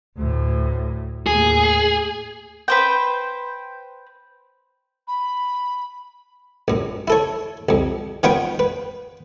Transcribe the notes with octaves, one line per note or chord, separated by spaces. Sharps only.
D2 A2
D#2 A2 G#4
B4 C5 G5
B5
A#1 F#2
E4 A4 C#5
C2 F2
D#3 B3 F4 B4 C#5 G5
B4